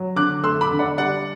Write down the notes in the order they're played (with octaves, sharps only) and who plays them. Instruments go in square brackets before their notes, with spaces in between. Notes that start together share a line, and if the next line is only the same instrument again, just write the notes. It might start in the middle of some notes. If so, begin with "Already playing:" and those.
Already playing: [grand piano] F#3
D3 D6 F#6
A3 C6 E6
B5 D6
D3
D5 F#5
G3 D5 F#5